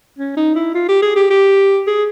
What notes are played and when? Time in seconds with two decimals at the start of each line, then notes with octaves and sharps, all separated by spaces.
0.18 C#4
0.37 D#4
0.56 E4
0.75 F4
0.89 G4
1.02 G#4
1.16 G4
1.30 G4
1.87 G#4